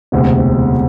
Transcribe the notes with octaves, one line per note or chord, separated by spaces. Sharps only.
E1 D2 C3